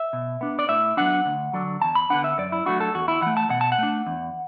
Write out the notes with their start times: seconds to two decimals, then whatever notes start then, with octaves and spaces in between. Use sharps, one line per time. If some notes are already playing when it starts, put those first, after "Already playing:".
Already playing: E5
0.13 B2
0.41 B3 D4
0.59 D5
0.69 A2 E5
0.97 F#3 B3 D4 F#5
1.26 D2
1.53 D3 F#3 D4
1.81 E2 A5
1.95 B5
2.10 D3 B3 D4 F#5
2.24 E5
2.38 F#2 D5
2.52 E4
2.66 F#3 A3 D4 F#4
2.80 A4
2.94 E2 F#4
3.08 E4
3.22 E3 A3 F#5
3.37 A5
3.50 B2 F#5
3.61 A5
3.72 F#5
3.78 A3 D4
4.07 E2